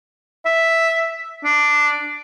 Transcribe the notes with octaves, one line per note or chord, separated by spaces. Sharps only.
E5
D4